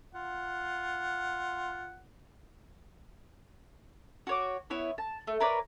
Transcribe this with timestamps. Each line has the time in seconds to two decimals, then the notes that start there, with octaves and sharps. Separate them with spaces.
0.14 F4 F#5
4.27 F#4 C#5 D6
4.70 B3 E4 C#5
4.98 A5
5.27 A3
5.40 A#4 B4 C#5 D5